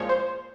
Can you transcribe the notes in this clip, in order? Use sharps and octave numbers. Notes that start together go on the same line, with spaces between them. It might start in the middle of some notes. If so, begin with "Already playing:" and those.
Already playing: C2 A#2 F3 G#3 C#5
C5